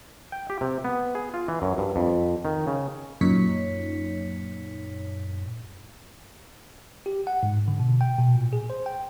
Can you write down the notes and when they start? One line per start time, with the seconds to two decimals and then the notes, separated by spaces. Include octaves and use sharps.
0.32 G5
0.50 G4
0.61 C3
0.85 B3
1.15 G#4
1.34 F4
1.48 E3
1.62 F#2
1.78 G2
1.96 F2
2.45 D#3
2.67 C#3
3.21 F#2 A#2 D#4 C#5 B6 C#7
7.06 G4
7.27 F#5
7.43 G#2
7.68 D3
7.80 B2
8.01 G5
8.19 B2
8.35 A#2
8.53 G#4
8.70 C5
8.86 G5